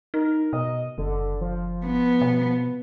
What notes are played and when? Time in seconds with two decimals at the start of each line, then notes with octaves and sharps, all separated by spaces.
0.14 D#4 A#4
0.53 B2 D#5
0.98 F#1 D3
1.41 F3
1.86 B3
2.21 B2